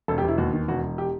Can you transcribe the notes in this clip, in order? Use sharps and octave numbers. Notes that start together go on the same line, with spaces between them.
E1 A4
G4
E1
E4
D#2 F#4
D#3
E1 F#4
E1
G4